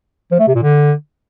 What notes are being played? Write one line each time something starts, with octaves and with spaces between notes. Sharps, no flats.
F3
A3
C3
A#2
D3